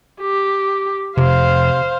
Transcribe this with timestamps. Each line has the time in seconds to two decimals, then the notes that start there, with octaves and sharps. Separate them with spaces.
0.21 G4
1.17 F1 C3 C5 F5